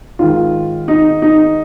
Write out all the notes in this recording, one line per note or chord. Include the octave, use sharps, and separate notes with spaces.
G#2 D#3 F4
D#4
D#4